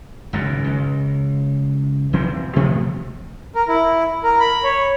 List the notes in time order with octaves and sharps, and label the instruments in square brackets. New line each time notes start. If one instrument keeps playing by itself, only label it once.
[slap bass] G#1 C#2 F#2
C#2
D#1 E3 C4
B2 F3 A3 B3
[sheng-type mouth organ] A#4
E4
A#4
B5
C#5